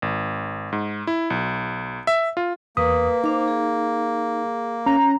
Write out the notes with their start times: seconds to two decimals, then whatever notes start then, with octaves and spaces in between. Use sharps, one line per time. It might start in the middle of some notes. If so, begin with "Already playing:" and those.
0.02 G#1
0.72 G#2
1.07 E4
1.30 B1
2.07 E5
2.37 F4
2.77 E2 A#3 B4 D#6
3.24 D#4 C5 F5 D6
3.48 G#4
4.86 C#4 A#5